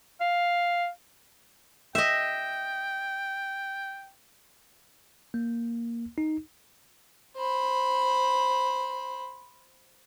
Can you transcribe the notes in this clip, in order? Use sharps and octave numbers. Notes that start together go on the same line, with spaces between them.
F5
D#5 E5 G5
A#3
D#4
C5 B5